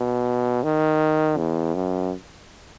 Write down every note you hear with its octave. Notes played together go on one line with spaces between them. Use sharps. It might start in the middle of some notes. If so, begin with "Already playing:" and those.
Already playing: B2
D#3
E2
F#2